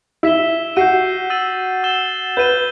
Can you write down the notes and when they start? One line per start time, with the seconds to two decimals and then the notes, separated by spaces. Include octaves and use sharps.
0.23 E4 E6 B6 E7 G7
0.76 F#4 G6 C7 D#7
1.30 E6 A6 D#7 F#7
1.84 E6 A6 E7 G7
2.37 B4 G6 D#7 G7